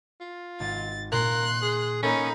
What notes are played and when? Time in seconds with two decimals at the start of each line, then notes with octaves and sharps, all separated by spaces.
0.21 F4
0.60 G#1 A6
1.12 A#2 A#4 C6 F#6
1.62 G#4
2.03 A#3 C#4 D#4 A4 A#4 B5